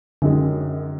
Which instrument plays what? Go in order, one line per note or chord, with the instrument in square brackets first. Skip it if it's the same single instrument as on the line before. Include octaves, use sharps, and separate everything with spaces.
[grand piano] F#2 D#3 G#3 [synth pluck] D3